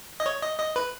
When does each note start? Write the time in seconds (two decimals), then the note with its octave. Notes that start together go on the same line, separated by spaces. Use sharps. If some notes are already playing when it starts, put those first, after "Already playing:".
0.20 D#5
0.26 C#5
0.42 D#5
0.59 D#5
0.76 B4